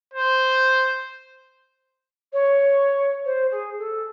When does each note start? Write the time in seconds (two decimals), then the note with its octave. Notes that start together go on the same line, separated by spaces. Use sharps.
0.14 C5
2.33 C#5
3.25 C5
3.51 G#4
3.78 A4